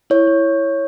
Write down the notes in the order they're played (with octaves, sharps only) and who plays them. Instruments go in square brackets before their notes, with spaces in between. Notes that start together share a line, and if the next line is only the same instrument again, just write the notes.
[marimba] E4 [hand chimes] C#5
[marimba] E4